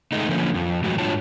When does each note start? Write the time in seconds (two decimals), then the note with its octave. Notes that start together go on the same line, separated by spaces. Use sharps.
0.12 D#3 G#3 A3 D#4
0.29 D3 F3 A#3 C#4
0.54 F2
0.84 A2 E3 F#3 G#3 F#4
0.98 G#2 G3 D4 F4 C#5 A5